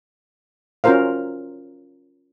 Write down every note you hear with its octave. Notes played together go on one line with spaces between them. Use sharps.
C#4 F4 F#4 A#4 C5 F5